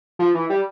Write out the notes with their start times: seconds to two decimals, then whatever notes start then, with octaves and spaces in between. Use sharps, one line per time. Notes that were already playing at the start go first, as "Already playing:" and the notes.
0.19 F3
0.35 E3
0.50 G3